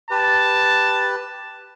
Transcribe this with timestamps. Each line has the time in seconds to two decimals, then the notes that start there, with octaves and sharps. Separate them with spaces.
0.11 G4 B4 A5